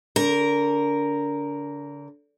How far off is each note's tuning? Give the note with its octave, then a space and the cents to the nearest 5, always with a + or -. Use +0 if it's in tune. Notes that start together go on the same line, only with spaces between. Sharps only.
D3 -35 A#4 +0